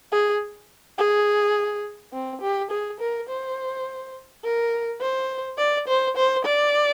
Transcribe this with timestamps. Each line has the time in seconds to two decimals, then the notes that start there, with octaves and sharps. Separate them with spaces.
0.12 G#4
0.98 G#4
2.13 C4
2.41 G4
2.70 G#4
3.00 A#4
3.29 C5
4.44 A#4
5.01 C5
5.58 D5
5.88 C5
6.16 C5
6.44 D5